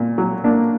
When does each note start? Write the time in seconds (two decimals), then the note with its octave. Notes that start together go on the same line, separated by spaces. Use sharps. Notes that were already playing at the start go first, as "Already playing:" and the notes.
Already playing: A#2
0.18 F#3
0.44 A#3 D4